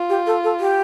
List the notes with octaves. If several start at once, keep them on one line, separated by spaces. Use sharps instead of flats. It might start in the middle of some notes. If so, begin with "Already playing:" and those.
Already playing: F4
G4
A4
A4
G4